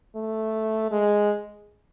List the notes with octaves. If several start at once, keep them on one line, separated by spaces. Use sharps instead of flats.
A3
G#3